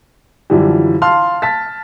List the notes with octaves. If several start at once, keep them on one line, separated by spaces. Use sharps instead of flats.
F#2 D3 E3 F3 G3
F5 A5 C6 F6
A5 A6 B6